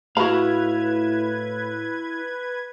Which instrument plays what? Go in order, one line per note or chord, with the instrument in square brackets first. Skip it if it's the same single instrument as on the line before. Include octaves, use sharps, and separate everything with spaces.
[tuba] A2 [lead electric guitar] E4 F5 [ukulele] F#4 B5 [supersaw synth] B4 G#6